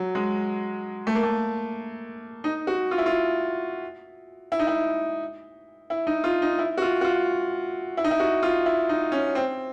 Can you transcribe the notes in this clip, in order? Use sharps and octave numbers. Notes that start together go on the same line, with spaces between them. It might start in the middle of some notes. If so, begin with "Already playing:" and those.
Already playing: F#3
G#3
A3
A#3
A3
D#4
F#4
F4
E4
F4
E4
D#4
E4
E4
D#4
F4
D#4
E4
F#4
F4
F#4
F4
E4
D#4
E4
F#4
F4
E4
D#4
C#4
C4